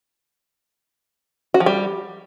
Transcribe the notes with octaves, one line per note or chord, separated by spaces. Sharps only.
F#4
F3
G3